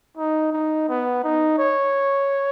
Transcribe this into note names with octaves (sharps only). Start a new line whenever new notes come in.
D#4
D#4
B3
D#4
C#5